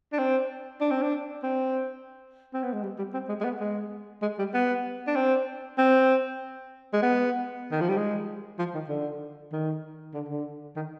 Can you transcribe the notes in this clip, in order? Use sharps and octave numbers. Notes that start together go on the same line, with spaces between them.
D4
C4
D4
C4
D4
C4
C4
B3
G#3
G3
G3
C4
G#3
G#3
B3
G#3
G#3
G3
B3
D4
C4
C4
G#3
B3
D#3
F3
G3
G#3
F3
D#3
D3
D#3
D3
D3
D#3